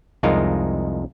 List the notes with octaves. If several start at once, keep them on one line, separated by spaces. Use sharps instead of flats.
C2 F2 G#3 D#4 F4 A#4